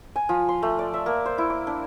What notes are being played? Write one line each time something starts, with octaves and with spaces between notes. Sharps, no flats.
G#5
F3
C6
A3
D5
E5
A#3
C5
E4
D6
D4